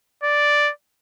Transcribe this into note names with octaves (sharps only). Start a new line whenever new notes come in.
D5